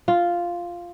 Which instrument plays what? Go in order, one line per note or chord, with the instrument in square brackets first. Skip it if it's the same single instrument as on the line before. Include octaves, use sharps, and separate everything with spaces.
[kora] F4